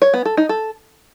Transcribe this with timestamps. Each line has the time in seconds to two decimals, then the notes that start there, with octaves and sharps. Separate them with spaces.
0.02 C#5
0.14 B3
0.25 A4
0.37 D#4
0.49 A4